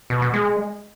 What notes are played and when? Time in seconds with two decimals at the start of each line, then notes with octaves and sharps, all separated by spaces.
0.10 B2
0.22 B2
0.33 G#3